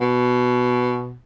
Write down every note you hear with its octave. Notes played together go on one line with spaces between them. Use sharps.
B2